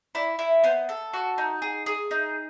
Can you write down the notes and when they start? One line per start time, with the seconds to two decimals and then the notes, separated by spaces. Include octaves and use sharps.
0.15 E4 D5
0.39 E4
0.64 B3 C5
0.89 A4
1.14 F#4
1.38 D#4
1.62 G#4
1.86 G#4
2.11 D#4